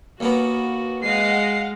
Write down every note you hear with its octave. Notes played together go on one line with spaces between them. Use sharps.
D#2 A#3 B3 F#4
G#3 D#5 F5 F#5 C7